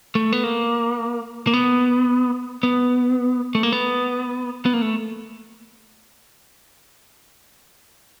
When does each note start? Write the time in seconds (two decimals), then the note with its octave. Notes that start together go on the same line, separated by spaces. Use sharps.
0.15 A3
0.33 B3
0.44 A#3
1.47 A#3
1.53 B3
2.63 B3
3.55 A3
3.63 A#3
3.72 B3
4.66 B3
4.73 A#3
4.82 A3